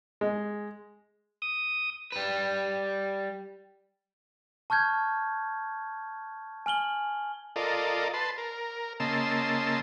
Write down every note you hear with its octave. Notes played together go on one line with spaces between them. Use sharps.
G#3
D#6
G3 B4
A5 C#6 F6 G6 G#6
G#5 F6 F#7 G7
F4 A4 A#4 D5 D#5
B4 A5 C6
A#4
C#3 A#3 D#5 A5 C6 E6